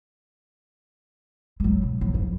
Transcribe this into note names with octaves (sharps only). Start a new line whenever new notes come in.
F#3 G#3
B2
F#3
F2 F3